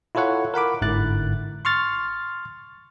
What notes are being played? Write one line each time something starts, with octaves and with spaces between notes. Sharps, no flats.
E4 F4 A4 C#5 F#5
A#4 F#5 B5 D6
G1 G#2 D3 E4 F#6 A6
C6 C#6 F6 A6